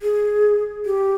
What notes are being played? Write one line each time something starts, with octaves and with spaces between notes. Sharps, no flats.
G#4
G4